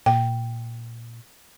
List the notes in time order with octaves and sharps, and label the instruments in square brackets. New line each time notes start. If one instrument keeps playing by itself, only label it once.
[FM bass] A#2 [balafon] G5